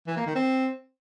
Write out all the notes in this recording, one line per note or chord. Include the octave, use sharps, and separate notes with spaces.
E3
A#3
D#3
C4